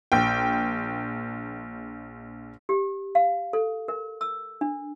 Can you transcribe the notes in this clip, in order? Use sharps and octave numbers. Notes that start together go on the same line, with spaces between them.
A#1 G5
G4
F5
A4
A#4
E6
D4